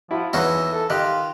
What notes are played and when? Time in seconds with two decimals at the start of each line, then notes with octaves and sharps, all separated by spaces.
0.11 F3 E4 F#4
0.33 E2 E3 D#4 F#4 C#5 E5 E6
0.73 A4
0.90 D#3 F4 G4 D#5 F#6